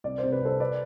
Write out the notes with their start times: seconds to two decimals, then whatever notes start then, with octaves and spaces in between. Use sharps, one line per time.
0.04 C2 D5
0.18 C3 C5
0.32 B4
0.42 C2 A4 C5
0.60 B4 D5